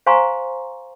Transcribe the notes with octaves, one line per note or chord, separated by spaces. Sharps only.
C5 F5 G#5 A#5 C6 C#6